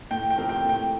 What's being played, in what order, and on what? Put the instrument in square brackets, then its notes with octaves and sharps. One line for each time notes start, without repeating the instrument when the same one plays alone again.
[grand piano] A2 [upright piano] G5
[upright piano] G5
[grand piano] F3 C4 G4 A#4
[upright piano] G5
[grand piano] A2 [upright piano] G5